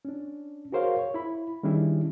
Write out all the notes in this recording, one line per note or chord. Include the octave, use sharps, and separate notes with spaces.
C#4 D4
F#4 G#4 A#4 C5 C#5 F5
C#5
E4 B5
D#3 G3 C#4 D4 E4 G#4